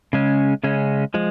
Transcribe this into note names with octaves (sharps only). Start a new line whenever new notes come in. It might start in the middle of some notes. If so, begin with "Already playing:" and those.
C#3 G#3 C#4
C#3 G#3 C#4
F3 G#3